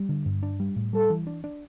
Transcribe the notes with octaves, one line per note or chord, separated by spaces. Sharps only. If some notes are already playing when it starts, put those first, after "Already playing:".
Already playing: G3
D3
G2
D4
G3
A2
G3 A4
E3
D4
D4